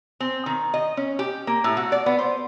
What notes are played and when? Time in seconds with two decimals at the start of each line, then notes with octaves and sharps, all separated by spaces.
0.20 C4
0.46 D#3
0.74 D#5
0.97 C#4
1.19 G4
1.47 A#3
1.64 A2
1.77 F#4
1.92 D5
2.06 B3
2.19 C5